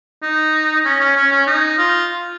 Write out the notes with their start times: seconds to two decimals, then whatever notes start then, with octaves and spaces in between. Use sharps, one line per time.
0.23 D#4
0.85 C#4
1.00 C#4
1.17 C#4
1.32 C#4
1.47 D#4
1.78 F4